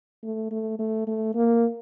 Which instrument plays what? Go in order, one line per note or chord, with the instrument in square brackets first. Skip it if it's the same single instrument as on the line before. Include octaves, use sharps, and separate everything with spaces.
[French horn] A3
A3
A3
A3
A#3